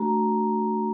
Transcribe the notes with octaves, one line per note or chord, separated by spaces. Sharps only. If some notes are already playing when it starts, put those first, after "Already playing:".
Already playing: A3 D4 F#4 A#5